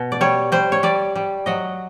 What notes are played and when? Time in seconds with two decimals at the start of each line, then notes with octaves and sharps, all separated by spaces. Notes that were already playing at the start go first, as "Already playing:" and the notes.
Already playing: B2
0.12 D5
0.21 G3 C#5
0.52 G3 C5
0.72 C#5
0.83 G3 D5
1.15 G3
1.46 F#3 D#5